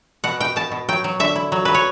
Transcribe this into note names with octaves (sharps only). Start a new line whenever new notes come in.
B2 F#5
B2 G5
B2 A5
B2
F#3 G5
F#3
D3 E5
E4
F#3
F#3 B4
C#5